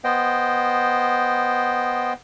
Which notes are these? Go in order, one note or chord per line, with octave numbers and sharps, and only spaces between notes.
B3 C5 D#5 G5